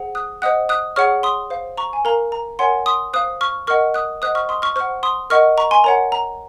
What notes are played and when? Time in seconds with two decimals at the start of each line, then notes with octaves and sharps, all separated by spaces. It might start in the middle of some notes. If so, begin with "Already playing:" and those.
Already playing: G#4 C5 F#5
0.15 D#6 F#6
0.42 C5 D#5 F#5 D#6 F#6
0.69 D#6 F#6
0.96 G#4 C#5 F#5 C#6 F6
1.23 C6 D#6
1.50 C5 F5
1.77 A#5 C#6
1.93 G#5
2.05 A#4 F5 A#5
2.32 A#5
2.59 A#4 C#5 F#5 G#5 C6
2.86 C6 D#6
3.13 C5 F5 D#6 F#6
3.41 C#6 F6
3.67 A#4 D#5 F#5 C#6 F6
3.94 D#6 F#6
4.22 C5 D#5 F#5 D#6 F#6
4.35 C#6 F6
4.49 C6 D#6
4.62 C#6 F6
4.76 C5 F#5 C#6 F6
5.03 C6 D#6
5.30 A#4 D#5 F#5 C#6 F6
5.58 A#5 C#6
5.71 G#5 C6
5.84 A#4 C#5 F#5 A#5
6.12 A#5